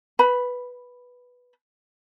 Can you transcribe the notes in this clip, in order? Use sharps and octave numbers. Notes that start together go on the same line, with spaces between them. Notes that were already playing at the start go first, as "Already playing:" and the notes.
B4 B5